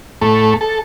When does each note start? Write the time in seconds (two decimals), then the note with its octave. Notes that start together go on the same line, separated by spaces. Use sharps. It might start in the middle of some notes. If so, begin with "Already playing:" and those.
0.21 A2 A3
0.61 A4